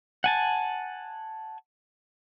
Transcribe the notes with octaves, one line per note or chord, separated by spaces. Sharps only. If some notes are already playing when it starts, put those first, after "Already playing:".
F#5 G#5 A5